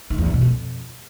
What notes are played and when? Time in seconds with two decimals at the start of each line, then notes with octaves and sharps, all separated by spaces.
0.10 D#3
0.18 E2
0.26 D3
0.34 B2
0.41 F2